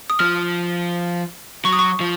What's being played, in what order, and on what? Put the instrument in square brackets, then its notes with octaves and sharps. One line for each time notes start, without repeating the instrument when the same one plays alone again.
[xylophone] D#6
[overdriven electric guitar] F3 [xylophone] F6
[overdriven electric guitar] F#3 [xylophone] C#6
[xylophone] D#6
C#6
[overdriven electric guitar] F3